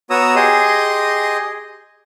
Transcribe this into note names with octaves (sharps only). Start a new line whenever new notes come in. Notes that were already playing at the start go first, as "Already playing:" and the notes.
B3 F#4 C#5 A#5 D#6 E6
G4 G#4 D#5 C6 D#6